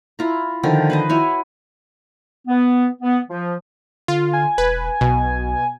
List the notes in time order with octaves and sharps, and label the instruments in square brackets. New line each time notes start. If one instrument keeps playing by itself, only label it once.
[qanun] E4 F4 A#5
D3 D#3 F3
B4 C5 D#5
E4 F#4 C#5 G#5
[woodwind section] B3
B3
F3
[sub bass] D3 [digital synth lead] F4
[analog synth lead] G#5
[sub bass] E1 [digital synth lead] B4
[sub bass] B1 [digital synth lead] B2